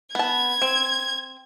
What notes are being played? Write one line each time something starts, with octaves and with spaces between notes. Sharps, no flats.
B3 A5 G#6
C4